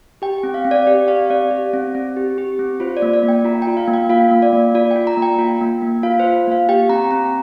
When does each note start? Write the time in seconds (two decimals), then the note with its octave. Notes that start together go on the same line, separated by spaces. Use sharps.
0.22 G4 G5
0.38 G5
0.43 C4
0.54 F5
0.65 C4
0.71 D5
0.87 G4 D5
1.08 G4 F5
1.30 C4 D5
1.51 G4
1.73 C4
1.95 C4
2.16 G4
2.38 G4
2.59 C4
2.80 F4 C5
2.97 D5
3.02 A#3
3.14 D5
3.23 A#3
3.28 G5
3.45 F4 A#5
3.62 G5
3.67 F4
3.77 F5
3.88 A#3
3.94 G5
4.09 F4 F5
4.31 A#3
4.42 D5
4.53 A#3
4.74 F4 D5
4.91 G5
4.96 F4
5.07 A#5
5.17 A#3
5.22 G5
5.39 F4
5.61 A#3
5.82 A#3
6.03 F4 F5
6.20 C5
6.26 F4
6.47 A#3 F5
6.69 G4 G5
6.89 C4 A#5
7.11 C4 A#5